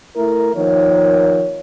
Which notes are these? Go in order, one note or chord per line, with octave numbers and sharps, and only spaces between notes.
A3 E4 A#4
D#3 F3 A#3 C#5